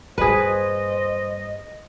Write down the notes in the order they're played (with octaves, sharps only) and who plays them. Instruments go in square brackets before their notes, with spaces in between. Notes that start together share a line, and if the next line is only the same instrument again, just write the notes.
[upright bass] G2 A#2 [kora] G#4 B4 [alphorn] C5 [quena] D#5